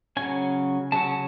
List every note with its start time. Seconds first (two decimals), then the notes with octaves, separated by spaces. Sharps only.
0.17 C#3 F#3 C#4 G#5
0.92 C#3 F#3 C#4 A5